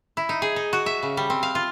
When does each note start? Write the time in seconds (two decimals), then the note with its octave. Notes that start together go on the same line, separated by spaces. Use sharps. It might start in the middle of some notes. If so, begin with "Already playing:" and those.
0.17 E4
0.29 D#4
0.42 G#4
0.56 D#4
0.73 F#4
0.86 E5
1.03 C#3
1.17 G3
1.30 C4
1.43 F5
1.55 F4